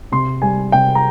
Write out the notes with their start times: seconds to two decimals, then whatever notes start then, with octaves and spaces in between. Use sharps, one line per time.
0.12 C3 C6
0.42 G3 G#5
0.72 C3 G5
0.95 A#5